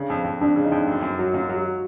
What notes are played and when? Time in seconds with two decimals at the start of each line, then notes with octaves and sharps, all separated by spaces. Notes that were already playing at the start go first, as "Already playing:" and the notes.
Already playing: C#3 D4
0.10 F2
0.24 F2
0.41 F2 D4
0.56 C#3
0.64 D#4
0.72 F2
0.87 F#2
1.03 F#2
1.19 F#3
1.34 F#2 F4
1.49 F#3
1.57 F#4